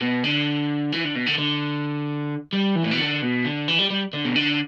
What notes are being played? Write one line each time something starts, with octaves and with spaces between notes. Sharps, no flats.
B2
D3
E3
D3
B2
D3
D3
G3
E3
A2
B2
D3
B2
D3
E3
G3
G3
D3
B2
D3